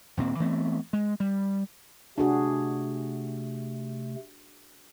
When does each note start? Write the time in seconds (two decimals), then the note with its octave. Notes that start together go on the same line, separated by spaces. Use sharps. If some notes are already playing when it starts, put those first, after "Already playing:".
0.17 D#1 A#2 C4
0.40 E3 A3 B3 C4
0.93 G#3
1.20 G3
2.18 C3 A3 D4 F#4 G#4